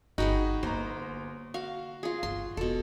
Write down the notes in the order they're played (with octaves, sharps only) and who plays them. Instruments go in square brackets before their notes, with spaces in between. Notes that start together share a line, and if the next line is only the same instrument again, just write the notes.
[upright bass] G1 [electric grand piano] D#4 F#4 F#5 [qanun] G#4 B4 G5
[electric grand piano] G1 A#5 [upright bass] D3 A#3 [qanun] C5
[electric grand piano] F#4 [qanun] F5
[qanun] F4 G#4
[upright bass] G1 [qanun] C6
[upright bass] E1 [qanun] B2 A4